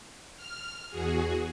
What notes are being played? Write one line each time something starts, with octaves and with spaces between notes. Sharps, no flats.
F6
E2 F#4 G#4